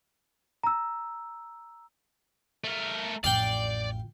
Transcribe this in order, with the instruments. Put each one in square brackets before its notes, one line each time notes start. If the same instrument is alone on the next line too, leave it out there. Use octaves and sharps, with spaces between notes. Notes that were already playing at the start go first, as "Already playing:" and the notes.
[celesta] A#5 E6
[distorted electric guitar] A3 A#4
[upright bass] A1 F2 [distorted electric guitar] D5 [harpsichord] F5 G5